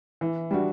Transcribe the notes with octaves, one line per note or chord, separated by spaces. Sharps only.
E3
G3 D4 F#4